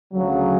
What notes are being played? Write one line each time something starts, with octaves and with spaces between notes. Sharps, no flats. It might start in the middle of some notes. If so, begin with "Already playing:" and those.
D2 C#3 F#3